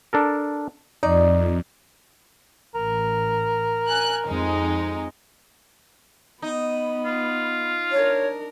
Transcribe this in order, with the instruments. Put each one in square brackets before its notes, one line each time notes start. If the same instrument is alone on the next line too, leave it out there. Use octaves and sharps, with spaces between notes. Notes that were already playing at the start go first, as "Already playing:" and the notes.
[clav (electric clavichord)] D4 A4 A#4
[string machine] F2 [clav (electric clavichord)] D#4 [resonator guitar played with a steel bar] D5
[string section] A1 [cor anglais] A#4
[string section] G#5 F#6
F2 G#3 D#4
[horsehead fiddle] B3 B5 [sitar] D#4
[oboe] F4
[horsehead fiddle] D4 A#4 [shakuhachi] C#5